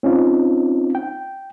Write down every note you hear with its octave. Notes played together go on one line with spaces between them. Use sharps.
C4 C#4 D#4 F4
G5